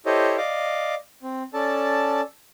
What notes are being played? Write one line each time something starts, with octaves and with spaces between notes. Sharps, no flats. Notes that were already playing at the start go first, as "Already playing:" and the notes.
E4 G4 A4 C5 C#5 D#5
D5 D#5 F5 D6
C4
C#4 A4 D5 A5